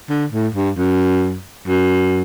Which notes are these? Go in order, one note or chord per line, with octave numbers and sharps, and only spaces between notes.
D3
A2
G2
F#2
F#2